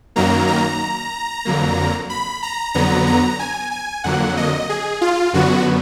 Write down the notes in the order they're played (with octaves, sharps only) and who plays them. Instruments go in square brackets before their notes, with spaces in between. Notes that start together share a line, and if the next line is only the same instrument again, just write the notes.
[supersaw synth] F#2 D#3 F#3 A#3 A#5
A#5
F2 D3 F#3 A#3
B5
A#5
F2 D3 F#3 B3 A#5
A#5
G#5
G#5
F2 D3 F#3 A#3 F#5
D#5
G#4
F4
F#2 D3 F#3 B3 F#4